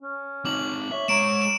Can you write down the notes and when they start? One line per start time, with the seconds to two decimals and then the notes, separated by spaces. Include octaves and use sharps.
0.03 C#4
0.45 C4 D#4 D6 F#7
0.92 C#5 E5
1.08 G#3 C#5 A#5 D7 E7
1.42 E7